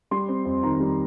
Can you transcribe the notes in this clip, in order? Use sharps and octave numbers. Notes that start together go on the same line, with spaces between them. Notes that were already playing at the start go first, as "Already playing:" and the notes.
G3 C6
C4
F2
D#3 A#5
G3